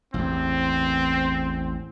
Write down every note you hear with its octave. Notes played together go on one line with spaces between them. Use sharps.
A1 E2 C4